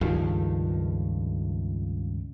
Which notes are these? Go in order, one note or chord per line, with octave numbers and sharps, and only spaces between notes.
C#2 G2 D#3 F3